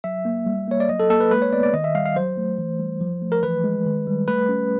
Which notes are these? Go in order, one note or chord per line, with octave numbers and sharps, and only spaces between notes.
F#3 E5
A#3
G3
A#3 C#5
D5
F#3 D#5
A4
A#3 A4
B4
G#3 B4
C#5
B3 D5
D5
D#3 D#5
E5
G3 F5
F5
F#3 C5
A3
E3
G3
F3
A3
A#4
E3 B4
G#3
D#3
G3
A3 B4
C#4